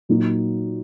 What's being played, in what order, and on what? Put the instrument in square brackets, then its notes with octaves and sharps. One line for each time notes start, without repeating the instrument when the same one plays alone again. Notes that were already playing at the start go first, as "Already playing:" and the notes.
[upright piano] A#2 F#3 A#3 D#4 F#4